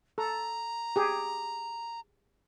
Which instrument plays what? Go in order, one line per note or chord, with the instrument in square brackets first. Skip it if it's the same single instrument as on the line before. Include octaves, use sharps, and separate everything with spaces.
[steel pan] A4 [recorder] A#5
[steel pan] G4 G#4